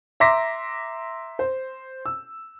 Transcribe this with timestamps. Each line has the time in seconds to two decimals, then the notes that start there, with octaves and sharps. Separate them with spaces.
0.20 E5 A#5 C6 D6 A#6 B6
1.39 C5
2.06 E6